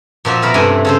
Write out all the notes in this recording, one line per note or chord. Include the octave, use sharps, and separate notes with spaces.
A#2 F3 F#4 E5
B2 A#4 B5
G2 C3 A3 E5 G#5
C#3 A4 C5